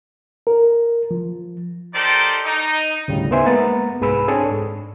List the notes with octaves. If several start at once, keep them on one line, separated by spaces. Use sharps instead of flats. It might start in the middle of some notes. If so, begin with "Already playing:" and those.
A#4
F3
D#4 G4 A4 A#4 C5 D5
D#4
D2 A2 C#3 G3
B3 D#4 C5 E5 G#5
G#3 A#3 B3 A#5 A6
C2 G#2 G#4 B4 B5 E6
C4 D4 G#4 A4 C#5 A5
G#2